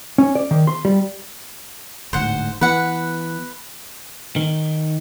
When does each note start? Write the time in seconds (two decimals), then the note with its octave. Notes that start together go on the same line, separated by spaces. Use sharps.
0.18 C#4
0.35 D5
0.51 D#3
0.67 C6
0.85 G3
2.13 D1 D2 G#2 C5 F#5
2.61 E3 B3 B4 F#5
4.36 D#3